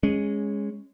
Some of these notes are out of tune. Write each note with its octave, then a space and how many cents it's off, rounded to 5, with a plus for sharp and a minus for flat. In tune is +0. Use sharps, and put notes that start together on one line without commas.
G#3 -10 C#4 +0